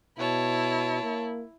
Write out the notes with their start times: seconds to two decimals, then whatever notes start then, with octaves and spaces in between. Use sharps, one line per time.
0.19 B2 E4 C#5 A5
1.03 A#3